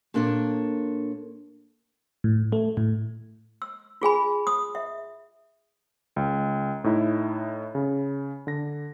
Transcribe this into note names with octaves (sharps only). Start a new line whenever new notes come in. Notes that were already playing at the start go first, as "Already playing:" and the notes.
A#2 A#3 D4 A4 C#5
A2
A3
A2
E6
F4 G#4 G#5 B5
D#6
E5
C#2
A2 D#4 E4
C#3
D3 A#6